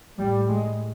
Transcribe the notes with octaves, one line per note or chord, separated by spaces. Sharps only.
A2 G3
G#3